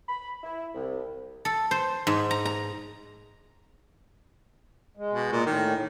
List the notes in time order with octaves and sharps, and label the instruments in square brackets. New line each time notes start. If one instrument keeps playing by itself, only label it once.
[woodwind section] B5
E4
C2
[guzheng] A4
C5
G#2
A#5
A#5
[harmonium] G#3
[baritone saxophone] B2
A#2
[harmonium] A2 [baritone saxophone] D#3